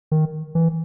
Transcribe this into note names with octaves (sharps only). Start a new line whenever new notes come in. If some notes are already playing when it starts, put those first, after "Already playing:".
D#3
E3